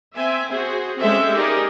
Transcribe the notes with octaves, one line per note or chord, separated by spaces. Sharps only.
C4 E5 G#5
F#4 G#4 C5
G#3 C4 C#4 A4 C5 E5
D#4 G4 G#4 A#4 D5